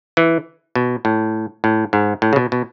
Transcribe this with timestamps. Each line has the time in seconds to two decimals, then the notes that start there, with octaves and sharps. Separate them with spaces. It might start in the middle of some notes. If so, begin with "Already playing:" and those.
0.17 E3
0.75 B2
1.05 A2
1.64 A2
1.93 G#2
2.22 A2
2.33 C#3
2.36 B2
2.52 B2